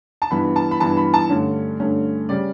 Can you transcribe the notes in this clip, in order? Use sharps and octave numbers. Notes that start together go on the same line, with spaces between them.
A5
G2 E3 B3 B5
A5
B5
G2 E3 B3 A5
B5
A5
G2 D3 A3 C#4
G2 D3 A3 C#4
C#3 G3 C#4 D5